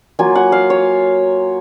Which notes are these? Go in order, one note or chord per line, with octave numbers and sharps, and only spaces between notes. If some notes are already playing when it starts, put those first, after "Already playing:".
F#3 A#3 F4 G#5
F#5
F5
C#5